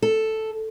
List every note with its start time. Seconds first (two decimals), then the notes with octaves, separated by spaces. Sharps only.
0.02 A4